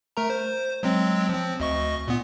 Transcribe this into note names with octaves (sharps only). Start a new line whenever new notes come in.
A3 A#4 A#5
C5
F#3 G#3 C4
F3 C4
D2 D#5 C#6
A#2 B3